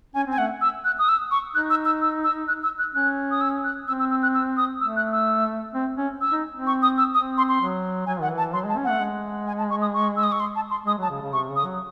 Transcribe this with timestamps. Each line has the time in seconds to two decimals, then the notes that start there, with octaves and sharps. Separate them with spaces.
0.14 C#4 G#5
0.27 C4 G#5
0.38 A3 F#5
0.61 E6
0.85 F#6
0.99 D#6
1.09 E6
1.31 C#6
1.55 D#4 F#6
1.70 E6
1.85 E6
2.02 E6
2.24 E6
2.48 F#6
2.63 E6
2.79 F#6
2.94 C#4 F#6
3.31 D#6
3.41 E6
3.64 F#6
3.88 C4 E6
4.00 E6
4.10 E6
4.23 F#6
4.34 E6
4.57 D#6
4.81 A3 E6
4.96 F#6
5.12 E6
5.74 C4
5.97 C#4
6.21 E6
6.32 D#4
6.55 C4
6.67 C#6
6.82 D#6
6.98 E6
7.14 C4 D#6
7.38 C6
7.49 C6
7.60 F#3
8.06 F#3 G#5
8.20 D#3 F#5
8.30 E3
8.37 A5
8.53 F#3 C6
8.65 G#3 A5
8.77 C#4
8.84 A3 F#5
9.00 G#3
9.47 G#5
9.58 A5
9.70 C#6
9.81 D#6
9.94 C#6
10.16 E6
10.23 D#6
10.32 C#6
10.40 C6
10.55 A5
10.71 C6
10.86 G#3 D#6
10.98 F#3 A5
11.10 C#3
11.22 C#3
11.33 C3 C#6
11.49 C#3
11.56 D#6
11.64 F#3